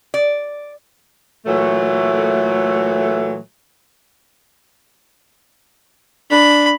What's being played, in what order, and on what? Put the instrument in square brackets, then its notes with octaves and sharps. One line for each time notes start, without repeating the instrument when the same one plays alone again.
[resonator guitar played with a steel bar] D5
[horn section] A#2 E3 F#3 A3
[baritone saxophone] D4 [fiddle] B5